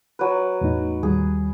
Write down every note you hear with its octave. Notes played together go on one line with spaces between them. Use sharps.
F#3 B4
E2 A2 D#4
D#2 G3 G#4